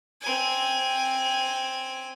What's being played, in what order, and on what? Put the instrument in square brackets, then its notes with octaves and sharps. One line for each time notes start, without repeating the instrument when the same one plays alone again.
[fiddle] C4 G#5